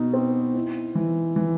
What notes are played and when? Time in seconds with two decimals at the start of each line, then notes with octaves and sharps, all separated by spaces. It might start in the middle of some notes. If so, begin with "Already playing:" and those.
Already playing: B2 D#4
0.14 C4
0.54 E4
0.95 E3
1.36 E3